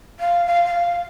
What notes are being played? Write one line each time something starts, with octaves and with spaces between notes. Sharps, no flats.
F5
F5
F5